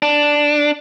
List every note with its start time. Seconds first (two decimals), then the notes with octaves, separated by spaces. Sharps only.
0.02 D4